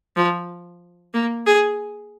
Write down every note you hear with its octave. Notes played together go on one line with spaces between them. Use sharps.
F3
A#3
G#4